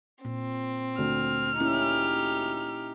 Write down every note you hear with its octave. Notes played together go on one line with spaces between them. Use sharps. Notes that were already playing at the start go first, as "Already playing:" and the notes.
A#2 C4
D2 F6
A#3 C#4 D#4 E4 G4